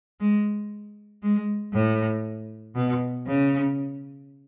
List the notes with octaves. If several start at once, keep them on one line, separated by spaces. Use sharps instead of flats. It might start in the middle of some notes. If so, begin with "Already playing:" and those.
G#3
G#3
A2
B2
C#3